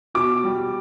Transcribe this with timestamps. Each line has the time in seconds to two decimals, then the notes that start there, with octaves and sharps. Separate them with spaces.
0.15 B2 D6
0.44 G3